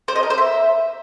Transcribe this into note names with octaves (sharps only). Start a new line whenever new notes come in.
C5
D#5
A#4
C5
E5